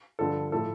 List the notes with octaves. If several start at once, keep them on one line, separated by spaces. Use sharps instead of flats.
G2 D3 F3 A4
A2 F3 A4